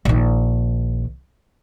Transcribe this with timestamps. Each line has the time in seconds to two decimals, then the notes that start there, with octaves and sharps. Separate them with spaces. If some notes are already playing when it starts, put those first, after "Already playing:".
0.05 A#1 D#3